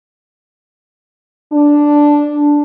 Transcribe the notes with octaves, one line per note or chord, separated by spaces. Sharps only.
D4